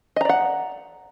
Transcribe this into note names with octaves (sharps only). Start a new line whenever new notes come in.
D5 D#5 F#5 A#5